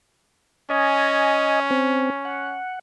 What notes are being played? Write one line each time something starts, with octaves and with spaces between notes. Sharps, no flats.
C#4 D#5 G#5
C4
F#5